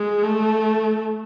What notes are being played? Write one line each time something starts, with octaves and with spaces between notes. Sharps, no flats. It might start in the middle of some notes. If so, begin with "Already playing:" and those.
Already playing: G#3
A3